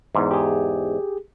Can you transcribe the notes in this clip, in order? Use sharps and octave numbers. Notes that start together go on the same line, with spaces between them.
E2 G#2
G4 G#4